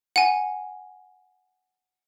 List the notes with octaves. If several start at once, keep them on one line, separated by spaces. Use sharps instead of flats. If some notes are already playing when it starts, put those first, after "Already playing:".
F#5 G#5